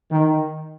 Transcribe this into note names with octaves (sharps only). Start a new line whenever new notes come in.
D#3